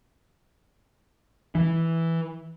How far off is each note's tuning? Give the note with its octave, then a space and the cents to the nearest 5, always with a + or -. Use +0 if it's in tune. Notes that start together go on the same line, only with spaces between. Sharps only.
E3 +0